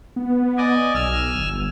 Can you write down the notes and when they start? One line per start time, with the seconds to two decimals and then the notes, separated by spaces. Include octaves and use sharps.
0.16 B3
0.58 D5 D#5 G#5
0.94 B1 G#5 E6 F6
1.35 G1